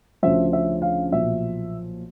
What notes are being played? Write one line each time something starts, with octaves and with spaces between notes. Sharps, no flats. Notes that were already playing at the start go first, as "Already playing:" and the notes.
D2 C#3 F3 E5
E5
F5
B1 A#2 F3 E5